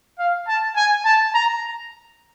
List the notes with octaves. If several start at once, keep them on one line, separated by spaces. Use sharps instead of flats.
F5
A5
G#5
A5
A#5